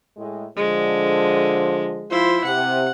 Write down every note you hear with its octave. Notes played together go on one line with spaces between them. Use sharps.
A2 G#3
D3 F3 G#3
F3 E4 F4 C5
C3 F#5